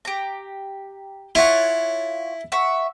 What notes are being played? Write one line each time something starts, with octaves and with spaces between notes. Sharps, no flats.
G4 A#5
E4 F4 C#5 F#5
E5 F#5 C#6